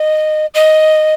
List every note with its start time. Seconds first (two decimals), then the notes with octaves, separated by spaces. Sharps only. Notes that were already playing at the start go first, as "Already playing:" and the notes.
Already playing: D#5
0.55 D#5